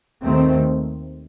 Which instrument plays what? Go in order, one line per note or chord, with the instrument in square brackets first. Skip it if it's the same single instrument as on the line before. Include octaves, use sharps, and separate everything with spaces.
[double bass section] D#2 D#3 A3 C4